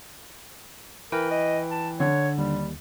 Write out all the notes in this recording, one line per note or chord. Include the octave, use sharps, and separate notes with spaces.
E3 A#4 B4 G5
D#5
A5
D3 C#5
D#2 G3